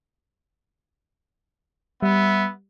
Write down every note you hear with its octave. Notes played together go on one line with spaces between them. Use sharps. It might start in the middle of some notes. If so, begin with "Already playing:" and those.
G3 B3 E5